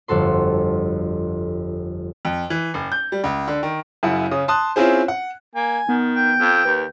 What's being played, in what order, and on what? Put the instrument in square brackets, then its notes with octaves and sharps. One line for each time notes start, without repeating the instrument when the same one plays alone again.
[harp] G1 F2 F#4 A4 C6
[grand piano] F2
E3
F#1
G6
G3
C#2
D3
D#3
[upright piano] F#2 C#3 E4 F#5
C#3 C#4 D#6
A5 C6 D#6 F#6
C4 C#4 E4 F4 G#4 C5
F#5
[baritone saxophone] A#3 [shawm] G#5
[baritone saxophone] D#3 [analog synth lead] B3
[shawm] G5
[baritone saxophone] F2
[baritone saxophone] D#2 [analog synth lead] B4